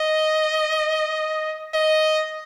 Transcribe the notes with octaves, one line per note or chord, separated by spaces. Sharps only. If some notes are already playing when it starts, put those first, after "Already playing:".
Already playing: D#5
D#5